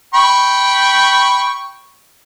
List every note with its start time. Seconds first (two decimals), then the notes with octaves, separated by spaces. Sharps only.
0.14 G5 B5 C#6